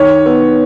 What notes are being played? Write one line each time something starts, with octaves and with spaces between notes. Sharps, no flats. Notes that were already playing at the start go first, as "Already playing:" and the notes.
Already playing: D#3 C#5
B3